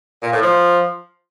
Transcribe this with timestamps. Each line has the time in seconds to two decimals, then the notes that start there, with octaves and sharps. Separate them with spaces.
0.23 A#2
0.32 A2
0.42 F3